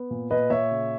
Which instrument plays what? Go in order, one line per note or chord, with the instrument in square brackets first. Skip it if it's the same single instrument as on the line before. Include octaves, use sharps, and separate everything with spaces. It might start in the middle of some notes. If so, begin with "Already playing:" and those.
Already playing: [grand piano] B3
A#2
A#2 B4 D#5
A#2 C#5 E5
C#3